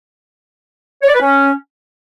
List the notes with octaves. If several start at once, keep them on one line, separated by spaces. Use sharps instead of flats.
C#5
D5
B4
C#4